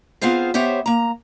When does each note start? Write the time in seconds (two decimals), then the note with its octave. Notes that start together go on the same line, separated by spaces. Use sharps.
0.21 B3 C4 F4 G#4 C5 F5
0.54 B3 G4 C5 C#5 E5
0.86 A#3 A#5